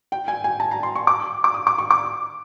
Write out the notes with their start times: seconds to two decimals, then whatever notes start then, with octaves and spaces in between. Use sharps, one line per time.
0.12 G5
0.28 G#5
0.44 G#5
0.60 A5
0.71 A#5
0.83 C6
0.95 C#6
1.07 D6
1.44 D6
1.54 D#6
1.67 D6
1.78 C#6
1.91 D6